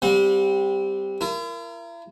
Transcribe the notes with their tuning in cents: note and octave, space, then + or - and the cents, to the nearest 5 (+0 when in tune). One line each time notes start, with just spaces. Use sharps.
G3 +5 C4 +0 F#5 -40
E4 +45 A#4 +0